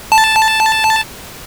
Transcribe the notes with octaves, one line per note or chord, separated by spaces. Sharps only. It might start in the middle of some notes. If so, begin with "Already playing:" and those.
A5